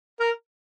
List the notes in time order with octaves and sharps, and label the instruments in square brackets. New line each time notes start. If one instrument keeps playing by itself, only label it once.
[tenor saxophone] A#4